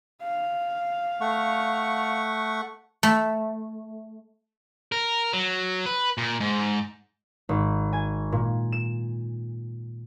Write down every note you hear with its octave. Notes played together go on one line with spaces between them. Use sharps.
F5
A3 F#5 C#6
A3
A#4
F#3
B4
A#2
G#2
G#1
G#5
A#2
E7